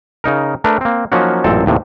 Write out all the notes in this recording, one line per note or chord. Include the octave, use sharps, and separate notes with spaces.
C#3 D#4 A#4
A3 D4 A#4 B4
A#3 C4
F3 F#3 A#3 C#4 D#4 F#4
A1 F#2 A#2 C4 A4
D#2 A2 C3